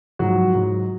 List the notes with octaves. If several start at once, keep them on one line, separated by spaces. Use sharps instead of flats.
G#2 F3 F#3 F#4
G#2 F#3